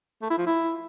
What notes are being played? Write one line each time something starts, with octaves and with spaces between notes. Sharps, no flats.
A3
E4
F3
E4